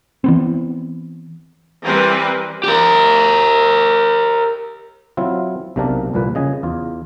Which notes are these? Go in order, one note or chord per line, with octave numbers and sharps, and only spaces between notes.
E3 B3 C4
E3 G3 C4 A#4 B4
G4 A#4
F#3 C4 E4 F4
B1 C3 A#3 D4 A#4 A5
C2 F2 A#2 B4
C#3 D#5 G#5
E2 F4